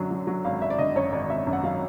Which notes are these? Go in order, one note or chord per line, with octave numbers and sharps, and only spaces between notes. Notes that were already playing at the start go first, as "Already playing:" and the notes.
Already playing: F#2 D3 F#3
F#3
F#3
G#1 F5
G#1 E5
D5
D3 D#5
F#2 C#5
G#1 D5
G#1 E5
F#2
F#5
F#3 F5